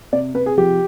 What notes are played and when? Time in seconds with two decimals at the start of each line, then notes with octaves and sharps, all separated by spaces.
0.12 C3 D5
0.34 C3 B4
0.46 G#4
0.58 F3 G4